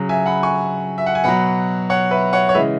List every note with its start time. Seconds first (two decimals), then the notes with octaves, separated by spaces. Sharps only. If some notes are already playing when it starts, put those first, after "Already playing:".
Already playing: C#3 F#3
0.09 E5 G#5
0.26 F#5 B5
0.43 G#5 C#6
0.98 E5
1.06 F#5
1.15 G#5
1.24 B2 F#3 F#5 B5
1.90 C#5 F#5
2.11 B4 E5
2.33 C#5 F#5
2.49 C#5
2.54 C#3 E3 G#3 B4 E5